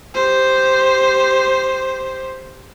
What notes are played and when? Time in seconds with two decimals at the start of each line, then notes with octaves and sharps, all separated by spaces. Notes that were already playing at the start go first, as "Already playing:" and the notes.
0.14 G4 C5